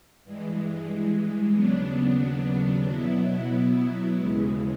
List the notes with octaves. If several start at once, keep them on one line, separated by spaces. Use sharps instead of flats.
G2 E3 G#3
D#2 C#3 F#3 B3 D4
B2 F#3 B3 E4
D#2 C#3 E3 G#3